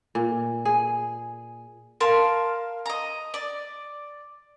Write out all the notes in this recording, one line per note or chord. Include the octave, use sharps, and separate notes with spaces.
A#2
G#4
A#4 F5 A5 C6
D#5 A#5
D5